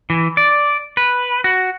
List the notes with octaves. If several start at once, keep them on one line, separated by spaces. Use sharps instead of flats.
E3
D5
B4
F#4